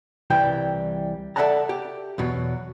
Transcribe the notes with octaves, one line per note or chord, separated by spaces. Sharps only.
C2 E3 G3 G5
A4 D5 E5 F#5 A5 A#5
G4
E2 B2 F#3